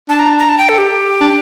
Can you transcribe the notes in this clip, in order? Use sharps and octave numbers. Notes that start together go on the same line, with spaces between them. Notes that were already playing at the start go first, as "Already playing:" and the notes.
D4 A5
A#5
A#5
A5
G5
A4
G4
D4